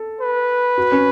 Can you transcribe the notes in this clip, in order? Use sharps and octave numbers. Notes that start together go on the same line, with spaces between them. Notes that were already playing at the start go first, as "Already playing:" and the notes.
Already playing: A4
B4
F#4
C#4